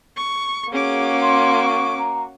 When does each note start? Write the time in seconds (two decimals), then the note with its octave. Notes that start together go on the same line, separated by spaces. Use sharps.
0.17 C#6
0.72 A#3 C#4 F#4 G#4 D6
1.21 C6
1.64 C#6
1.98 A#5